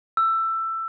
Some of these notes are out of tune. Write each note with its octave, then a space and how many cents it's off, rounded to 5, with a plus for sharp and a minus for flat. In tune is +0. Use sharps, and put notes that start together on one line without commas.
E6 +15